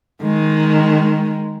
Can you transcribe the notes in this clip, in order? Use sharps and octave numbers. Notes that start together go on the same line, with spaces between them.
D#3 G#3